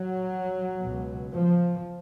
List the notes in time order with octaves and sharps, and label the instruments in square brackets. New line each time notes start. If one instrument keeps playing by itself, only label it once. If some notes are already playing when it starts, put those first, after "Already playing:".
Already playing: [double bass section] F#3
C#2 B2
F3